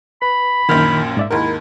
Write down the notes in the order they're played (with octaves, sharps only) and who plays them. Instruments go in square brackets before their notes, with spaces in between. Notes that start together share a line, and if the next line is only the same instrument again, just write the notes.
[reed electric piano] B4 [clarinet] B5
[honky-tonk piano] A#1 F#2 A#2 [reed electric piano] D#3 F6 G6
[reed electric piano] G#2 D5 E5
[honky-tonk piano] D#2 G#2 [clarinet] E4 [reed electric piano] A#4